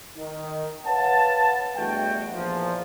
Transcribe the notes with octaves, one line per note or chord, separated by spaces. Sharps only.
D#3
B4 C#5 F5 F#5 A5
E2 G2 B2 A3 F#4 G5
E2 A#2 F3